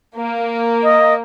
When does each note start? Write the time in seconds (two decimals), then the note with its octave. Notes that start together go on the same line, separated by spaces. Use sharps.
0.18 A#3
0.83 D#5